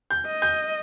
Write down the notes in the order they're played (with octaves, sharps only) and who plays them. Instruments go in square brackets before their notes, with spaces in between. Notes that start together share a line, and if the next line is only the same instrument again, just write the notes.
[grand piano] G6
[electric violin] D#5
[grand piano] G6